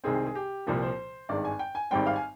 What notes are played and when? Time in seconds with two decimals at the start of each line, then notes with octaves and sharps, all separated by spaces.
0.04 C2 C3 D#3 G#3 C4 G#4
0.26 G#4
0.35 G4
0.66 C2 A#2 F3 A#3 G4
0.82 C5
1.29 G#1 G2 D#3 G#3 D5
1.45 G#5
1.59 G5
1.75 G#5
1.91 G#1 G#2 D#3 G3 C4 G5
2.07 F5
2.16 G#5